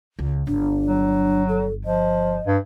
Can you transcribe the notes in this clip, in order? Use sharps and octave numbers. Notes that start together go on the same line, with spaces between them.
C#2
G1 D4
F#3
A4
F3 D#5
G2